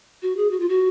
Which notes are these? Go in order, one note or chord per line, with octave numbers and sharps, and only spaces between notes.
F#4
G#4
F#4
F4
F#4